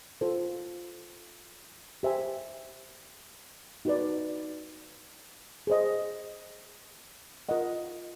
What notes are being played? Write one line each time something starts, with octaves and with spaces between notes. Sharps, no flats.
F4 A4 C5
G4 C5 E5 G#5
D#4 F#4 B4 D5
G#4 C5 D#5
F4 A#4 D#5 F#5